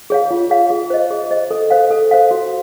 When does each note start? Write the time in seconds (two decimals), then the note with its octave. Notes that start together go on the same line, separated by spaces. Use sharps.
0.10 G#4 C#5 F5
0.31 F4
0.50 G#4 C#5 F5
0.70 G#4
0.90 C5 D#5
1.11 G#4
1.31 C5 D#5
1.51 A4
1.70 C5 F5
1.91 A4
2.11 C5 F5
2.31 F#4